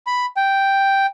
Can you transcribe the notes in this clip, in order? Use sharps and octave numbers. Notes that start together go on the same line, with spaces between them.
B5
G5